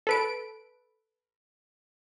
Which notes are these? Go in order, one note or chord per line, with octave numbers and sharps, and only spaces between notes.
A4 B4 D7